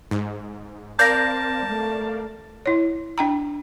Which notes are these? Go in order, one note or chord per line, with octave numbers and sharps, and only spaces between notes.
G#2
C4 A#4 D5 F5 A5 G6 A#6
A3
E4 C#5
D4 G5 A#5